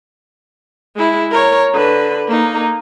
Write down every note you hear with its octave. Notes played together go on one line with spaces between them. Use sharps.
G#3 E4
A#4 C#5
D3 B4
A#3 D#4